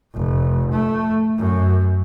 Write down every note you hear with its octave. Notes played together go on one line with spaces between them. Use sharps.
F1
A3
F#2